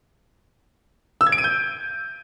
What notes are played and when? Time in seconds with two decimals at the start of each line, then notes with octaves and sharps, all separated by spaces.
1.21 E6
1.27 G#6
1.32 D7
1.38 D#7
1.44 G6